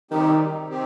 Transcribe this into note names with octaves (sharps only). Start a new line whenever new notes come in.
C3 D#3 G3 C4 D#4 G4
C3 D#3 C4 G4